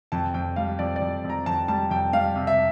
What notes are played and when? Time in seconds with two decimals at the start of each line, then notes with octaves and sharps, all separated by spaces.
0.12 F2 A5
0.34 F2 G5
0.56 G3 F5
0.79 F2 D5
0.96 D5
1.01 F2
1.24 F2
1.30 A#5
1.46 F2 A5
1.68 G3 A5
1.90 F2 G5
2.13 G3 F5
2.36 C3
2.47 E5